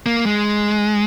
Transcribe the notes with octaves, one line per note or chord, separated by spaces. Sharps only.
A#3
G#3